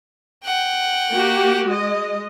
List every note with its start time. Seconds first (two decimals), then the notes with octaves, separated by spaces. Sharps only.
0.45 F#5 G5
1.11 A#3 F#4 G4
1.68 G#3 D#5